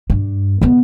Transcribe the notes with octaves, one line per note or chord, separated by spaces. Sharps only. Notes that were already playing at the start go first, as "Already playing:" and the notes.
G2
C#3 B3